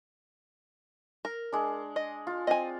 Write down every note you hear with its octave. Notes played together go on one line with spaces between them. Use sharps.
A#4
G#3 D4
D#5
F4
C4 D#5 G#5